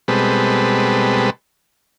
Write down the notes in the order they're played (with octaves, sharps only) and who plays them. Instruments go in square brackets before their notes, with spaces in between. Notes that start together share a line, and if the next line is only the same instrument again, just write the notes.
[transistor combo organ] B2 G3 G#3 C4 A4 B4